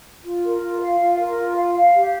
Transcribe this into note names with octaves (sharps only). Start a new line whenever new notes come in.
F4
A#4
F4
F5
F4
A#4
F4
F5
F5
G4